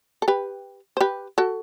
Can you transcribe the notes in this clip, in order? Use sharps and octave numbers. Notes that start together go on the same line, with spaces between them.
A4
G4 B4
C5
G4 B4
F#4 A4